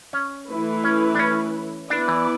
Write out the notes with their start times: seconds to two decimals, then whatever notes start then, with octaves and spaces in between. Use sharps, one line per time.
0.13 C#4
0.48 E3 A3 E4 B4
0.84 C#4
1.15 D4
1.19 C#4
1.90 B3 D4 E4 B4 D5
2.08 E3